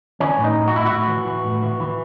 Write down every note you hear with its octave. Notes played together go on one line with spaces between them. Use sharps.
E3 C#4
A2
D#4
A2
F#4
A2 E4
F#4
A2
E3
E3
A2
E3
E3